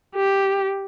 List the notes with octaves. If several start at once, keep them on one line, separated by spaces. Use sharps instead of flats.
G4